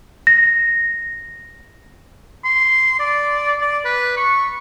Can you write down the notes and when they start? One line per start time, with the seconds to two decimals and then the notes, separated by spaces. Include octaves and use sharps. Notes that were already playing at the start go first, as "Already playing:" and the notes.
0.27 A#6
2.45 C6
3.00 D5
3.61 D5
3.85 B4
4.17 C#6